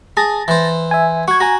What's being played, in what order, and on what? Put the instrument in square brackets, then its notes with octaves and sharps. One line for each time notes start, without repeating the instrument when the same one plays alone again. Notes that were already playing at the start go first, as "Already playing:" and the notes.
[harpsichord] G#4 [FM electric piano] A5 A6 A#6
[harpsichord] E3 C5
[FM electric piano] E5 G#5
[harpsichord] F#4 [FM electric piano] C#6 G#6
[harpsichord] F#4 [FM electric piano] G#5 A#5 A#6